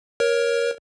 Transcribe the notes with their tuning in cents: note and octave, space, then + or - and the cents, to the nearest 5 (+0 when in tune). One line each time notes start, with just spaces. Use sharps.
A#4 +15 C#5 +0